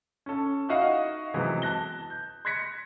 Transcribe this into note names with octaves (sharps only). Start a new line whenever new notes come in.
C#4 A4
D#4 E4 F#4 D#5 F5 F#5
C3 E3 F#3 G#3 B3
A5 F#6 A#6 G7
G6
C6 F#6 G#6 A#6 B6 C#7